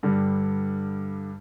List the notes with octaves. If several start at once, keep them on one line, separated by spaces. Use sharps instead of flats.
G2 D3 G3